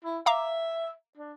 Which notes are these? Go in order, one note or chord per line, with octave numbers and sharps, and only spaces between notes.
E4
E5 F5 A#5 D6
D4